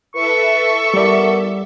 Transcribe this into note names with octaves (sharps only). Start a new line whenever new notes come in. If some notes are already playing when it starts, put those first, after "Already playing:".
E4 A4 B4 E5 C#6
G3 B3 E4 A#4 D5